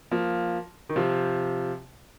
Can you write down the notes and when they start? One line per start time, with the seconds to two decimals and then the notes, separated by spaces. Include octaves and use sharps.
0.11 F3 A#3
0.90 D#3
0.96 C3 F3